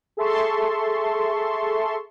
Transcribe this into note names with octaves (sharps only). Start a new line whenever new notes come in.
G#4 A4 E5 A5 C6 C#6